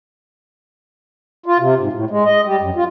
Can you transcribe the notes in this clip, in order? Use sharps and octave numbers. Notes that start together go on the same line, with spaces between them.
F4
C3
G#2
A2
G#3
D#5
G3
F#2
F4